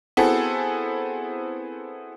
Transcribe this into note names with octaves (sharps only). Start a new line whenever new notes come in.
B3 C4 E4 F#4 G#4 A4